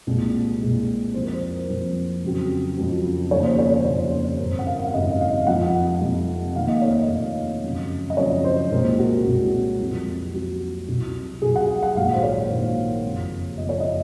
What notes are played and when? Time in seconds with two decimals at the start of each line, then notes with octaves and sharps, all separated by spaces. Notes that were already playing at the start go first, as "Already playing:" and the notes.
0.07 C2 A#2 G#3 C4
0.60 C2 A#2 G#3 C4
1.14 F2 C3 F3 C4 C5
1.24 A#4
1.33 C5
1.69 F2 C3 F3 C4
2.23 F2 C#3 F#3 C4
2.77 F2 C#3 F#3 C4
3.31 F1 D#2 C#3 F3 C#5
3.45 C5
3.59 C#5
3.72 C#5
3.85 F1 D#2 C#3 F3 C#5
4.12 C5
4.39 G#1 F#2 C#3 A#4
4.59 F#5
4.67 F5
4.84 F5
4.93 G#1 F#2 C#3 D#5
5.11 D#5
5.21 F5
5.47 F2 C3 F3 F#5
6.01 F2 C3 F3
6.56 F1 D#2 D#3 A#3 F5
6.68 D#5
6.82 C#5
6.95 D#5
7.09 F1 D#2 D#3 A#3
7.63 F#2 C#3 F3 C4
8.10 D#5
8.17 F#2 C#3 F3 C4 C#5
8.44 C5
8.71 C2 A#2 G#3 C4 A#4
8.99 F#4
9.26 C2 A#2 G#3 C4 F#4
9.80 F2 C3 F#3 C4
10.33 F2 C3 F#3 C4 F#4
10.88 C2 C3 F#3
11.42 C2 C3 F#3 G#4
11.56 F#5
11.83 F#5
11.96 A#1 G#2 D#3 F#3 A#3 F5
12.14 C5
12.23 C#5
12.51 A#1 G#2 D#3 F#3 A#3
13.05 F#1 F2 C3
13.58 F#1 F2 C3 D#5
13.69 C#5
13.80 D#5